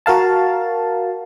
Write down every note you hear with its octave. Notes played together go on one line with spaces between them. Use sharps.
F#4 A#4 F5 A5